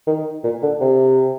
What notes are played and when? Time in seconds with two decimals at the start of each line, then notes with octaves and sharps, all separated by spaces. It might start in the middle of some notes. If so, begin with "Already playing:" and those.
0.07 D#3
0.44 A#2
0.62 D3
0.81 C3